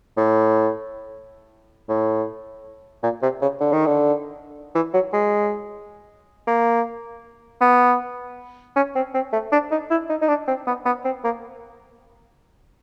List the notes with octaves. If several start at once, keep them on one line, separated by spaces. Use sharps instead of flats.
A2
A2
A#2
C3
C#3
D3
D#3
D3
E3
F#3
G#3
A#3
B3
C#4
C4
C4
A3
D4
D#4
E4
D#4
D#4
D4
C4
B3
B3
C4
A#3